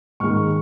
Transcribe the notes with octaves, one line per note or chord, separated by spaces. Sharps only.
G#2 D#3 G#3 C#6 F6